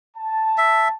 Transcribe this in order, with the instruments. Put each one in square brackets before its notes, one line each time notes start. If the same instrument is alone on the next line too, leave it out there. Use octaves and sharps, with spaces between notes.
[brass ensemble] A5
[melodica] E5